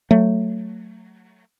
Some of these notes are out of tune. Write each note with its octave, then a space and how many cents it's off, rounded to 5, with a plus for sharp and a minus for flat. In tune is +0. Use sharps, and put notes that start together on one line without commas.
F#3 +0 A3 +15